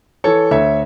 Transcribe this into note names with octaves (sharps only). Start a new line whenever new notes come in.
E3 A4 C#5
D2 C#5 E5